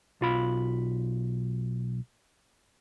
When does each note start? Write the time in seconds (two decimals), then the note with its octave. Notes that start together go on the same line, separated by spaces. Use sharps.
0.21 B1 F4 B5